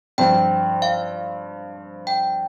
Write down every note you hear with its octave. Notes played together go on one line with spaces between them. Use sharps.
G2 F3 C4 F4 G5
F5
G5